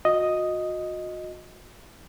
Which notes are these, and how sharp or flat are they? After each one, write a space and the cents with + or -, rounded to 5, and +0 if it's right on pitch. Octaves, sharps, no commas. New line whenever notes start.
F#4 -35 D#5 +0